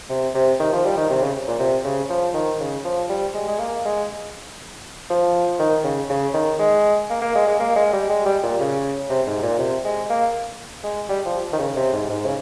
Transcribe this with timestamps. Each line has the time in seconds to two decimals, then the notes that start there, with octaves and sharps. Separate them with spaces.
0.10 C3
0.35 C3
0.60 D#3
0.73 F3
0.85 G3
0.97 D#3
1.10 C3
1.22 C#3
1.48 A#2
1.59 C3
1.84 C#3
2.10 F3
2.34 D#3
2.60 C#3
2.85 F3
3.09 G3
3.34 G#3
3.48 G#3
3.59 A#3
3.85 G#3
5.10 F3
5.59 D#3
5.84 C#3
6.10 C#3
6.34 D#3
6.59 G#3
7.10 A#3
7.22 A#3
7.35 G#3
7.47 G#3
7.60 A#3
7.76 G#3
7.93 G3
8.09 G#3
8.26 G3
8.43 A#2
8.60 C#3
9.10 C3
9.27 G#2
9.43 A#2
9.59 C3
9.85 G#3
10.10 A#3
10.84 G#3
11.09 G3
11.26 F3
11.53 D#3
11.59 C#3
11.77 C3
11.93 G#2
12.10 G#2
12.26 C#3